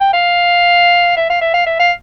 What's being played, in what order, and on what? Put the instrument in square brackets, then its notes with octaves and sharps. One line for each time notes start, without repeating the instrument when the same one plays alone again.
[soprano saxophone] G5
F5
E5
F5
E5
F5
E5
F5